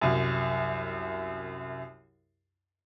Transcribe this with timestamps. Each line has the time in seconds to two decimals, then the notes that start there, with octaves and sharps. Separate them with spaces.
0.02 C2 F#2